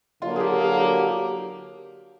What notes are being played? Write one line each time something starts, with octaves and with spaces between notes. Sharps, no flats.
D3 F#3 A#3 F4
G#4
G4
G#4
G4
G4